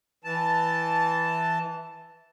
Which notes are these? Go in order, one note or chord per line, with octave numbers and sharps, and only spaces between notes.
E3 A5